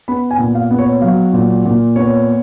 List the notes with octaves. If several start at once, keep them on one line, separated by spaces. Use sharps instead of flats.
B3 B5
G#5
A#2
F5
B3
C#5
F#3 F5
A#2
A#2
B3 C#5